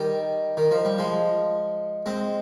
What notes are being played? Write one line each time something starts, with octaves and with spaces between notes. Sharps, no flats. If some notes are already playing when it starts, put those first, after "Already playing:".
Already playing: D#3 G3
D#3
F3
G3
F3 G#3
G#3 C4